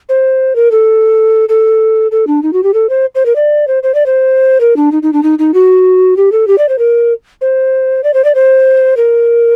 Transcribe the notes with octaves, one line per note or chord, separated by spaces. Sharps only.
C5
A#4
A4
A4
A4
D4
D#4
F#4
G4
A4
C5
C5
A#4
D5
C5
C5
D5
C5
A#4
D4
D#4
D#4
D4
D#4
D#4
F#4
G4
A4
G4
D5
C5
A#4
C5
D5
C5
D5
C5
A#4